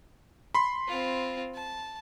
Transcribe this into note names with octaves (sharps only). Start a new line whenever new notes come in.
B5 C6
C4 F4
A5